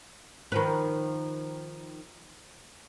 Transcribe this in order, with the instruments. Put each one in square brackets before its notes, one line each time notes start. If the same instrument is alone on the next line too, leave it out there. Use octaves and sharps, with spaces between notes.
[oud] D#3 F3 B4